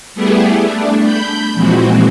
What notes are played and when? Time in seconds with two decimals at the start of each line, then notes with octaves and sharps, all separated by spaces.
0.15 G3 A3 B3 E4 G4 G#4
0.62 A3 D4
1.04 B5 G6
1.54 A#2 E3 F3 G#3 C4 F#4